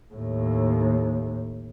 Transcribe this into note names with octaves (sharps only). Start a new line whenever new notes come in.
D#2 A2